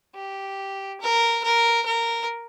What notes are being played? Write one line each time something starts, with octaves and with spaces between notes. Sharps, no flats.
G4
A#4
A#4
A#4